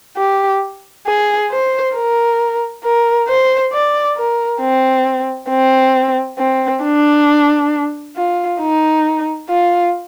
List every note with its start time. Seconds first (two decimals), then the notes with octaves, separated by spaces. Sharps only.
0.17 G4
1.07 G#4
1.50 C5
1.95 A#4
2.84 A#4
3.28 C5
3.73 D5
4.17 A#4
4.61 C4
5.50 C4
6.38 C4
6.83 D4
8.16 F4
8.61 D#4
9.49 F4